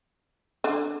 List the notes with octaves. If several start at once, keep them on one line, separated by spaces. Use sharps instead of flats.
D3